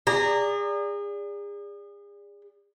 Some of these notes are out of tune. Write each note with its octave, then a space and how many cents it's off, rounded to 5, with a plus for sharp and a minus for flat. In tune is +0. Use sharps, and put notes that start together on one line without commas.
G#4 -35 D5 -10 A#5 -15